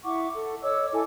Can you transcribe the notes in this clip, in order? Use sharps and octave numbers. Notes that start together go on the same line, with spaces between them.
E4 F#5 C#6 D6
A4
C#5 D#5 D6 E6
E4 A4 G#5 D6